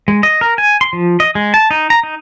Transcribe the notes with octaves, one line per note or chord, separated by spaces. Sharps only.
G#3
D#5
A#4
G#5
C6
F3
D#5
G#3
A5
D#4
A#5
D#4